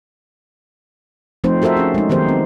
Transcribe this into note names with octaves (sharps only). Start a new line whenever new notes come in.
F3 A3 C4 D#4 C5
F#4 A4 A#4 C5 E5
C#4 G#4
G#3 D#4
D#3 F#3 B3 G4 A#4 C5
C4